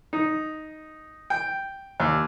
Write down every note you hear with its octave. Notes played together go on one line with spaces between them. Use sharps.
D#4
G5
D#2